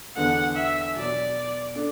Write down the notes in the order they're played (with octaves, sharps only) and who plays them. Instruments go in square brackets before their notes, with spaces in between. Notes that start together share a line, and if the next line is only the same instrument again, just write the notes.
[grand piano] E2 D3 B3 D4 A4 [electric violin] F#5
[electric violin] E5
[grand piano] B2 F#3 B3 [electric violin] D5
[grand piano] D4 A4